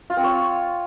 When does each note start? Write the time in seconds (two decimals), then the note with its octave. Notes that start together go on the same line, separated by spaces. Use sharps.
0.10 F4
0.17 C4
0.24 C#5